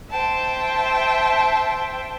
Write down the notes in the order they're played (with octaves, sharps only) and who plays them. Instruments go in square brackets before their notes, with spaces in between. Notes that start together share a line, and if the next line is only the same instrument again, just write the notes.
[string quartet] C5 E5 G5 A5